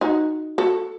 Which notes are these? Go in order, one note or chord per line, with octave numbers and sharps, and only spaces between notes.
D#4 F#4
F#4 A4